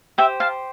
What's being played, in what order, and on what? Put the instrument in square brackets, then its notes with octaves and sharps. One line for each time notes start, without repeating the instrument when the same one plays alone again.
[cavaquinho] G4 C5 E5 G5
F5 A5